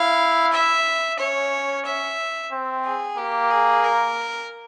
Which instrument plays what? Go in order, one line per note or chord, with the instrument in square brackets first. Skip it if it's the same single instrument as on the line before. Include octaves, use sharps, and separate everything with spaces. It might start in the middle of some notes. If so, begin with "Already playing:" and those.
Already playing: [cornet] E4 [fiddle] F5
[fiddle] E5
[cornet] C#4 [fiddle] C#5
[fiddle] E5
[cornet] C4
[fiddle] G#4
[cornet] A#3 [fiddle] G4
[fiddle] G#4
A#4